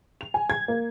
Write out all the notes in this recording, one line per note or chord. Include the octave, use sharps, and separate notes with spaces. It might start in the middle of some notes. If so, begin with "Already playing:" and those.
F7
G#5
G#6
A#3